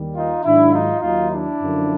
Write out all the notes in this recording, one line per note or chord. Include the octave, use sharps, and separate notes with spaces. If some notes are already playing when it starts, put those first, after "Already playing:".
Already playing: D#2 D#3 G3
D#4 F4
G#2 D#3 F#3 D4 E4
D#4 F4
D#2 D#3 F#3 D#4 F4
D4 E4
F#2 D3 F3